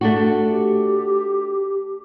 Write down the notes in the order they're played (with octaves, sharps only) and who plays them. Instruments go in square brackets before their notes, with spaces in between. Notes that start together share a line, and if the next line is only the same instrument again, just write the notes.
[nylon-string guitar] A3 D4 F#4
[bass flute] G4